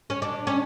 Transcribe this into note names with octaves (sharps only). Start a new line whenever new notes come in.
C#4
D4
C#4